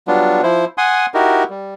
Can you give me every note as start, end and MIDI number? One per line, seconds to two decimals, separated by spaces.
0.08 0.42 54
0.08 0.42 55
0.08 0.42 59
0.08 0.42 62
0.08 0.42 65
0.43 0.65 53
0.43 0.65 64
0.43 0.65 72
0.78 1.06 78
0.78 1.06 80
0.78 1.06 84
0.78 1.06 87
1.14 1.44 63
1.14 1.44 64
1.14 1.44 66
1.14 1.44 67
1.14 1.44 70
1.50 1.74 55